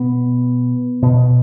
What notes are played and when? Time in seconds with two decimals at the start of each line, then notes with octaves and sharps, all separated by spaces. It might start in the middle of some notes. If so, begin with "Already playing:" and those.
Already playing: B2 B3
1.02 B2